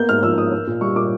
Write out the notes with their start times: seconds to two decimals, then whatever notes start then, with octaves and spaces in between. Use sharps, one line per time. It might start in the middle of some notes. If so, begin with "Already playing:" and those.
Already playing: A#3 B3 G6
0.09 G#2 F6
0.23 F3 E6
0.37 G#2 D#6
0.52 A#3
0.67 A#2
0.81 G3 C#6
0.96 A#2 D6